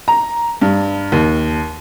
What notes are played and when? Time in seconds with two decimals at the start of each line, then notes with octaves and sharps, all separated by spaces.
0.08 A#5
0.62 G2
1.12 D#2